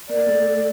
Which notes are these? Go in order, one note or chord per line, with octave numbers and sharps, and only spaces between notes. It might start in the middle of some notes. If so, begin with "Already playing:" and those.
A#3 A#4 D5
A3 A4